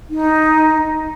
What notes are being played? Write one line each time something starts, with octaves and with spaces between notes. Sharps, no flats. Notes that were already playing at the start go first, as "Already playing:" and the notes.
D#4